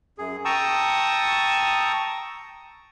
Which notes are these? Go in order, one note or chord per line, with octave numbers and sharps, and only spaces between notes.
F#2 G#4
G5 A5 A#5 C#6 D#6 E6